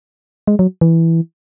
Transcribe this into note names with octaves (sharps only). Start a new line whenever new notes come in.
G#3
F#3
E3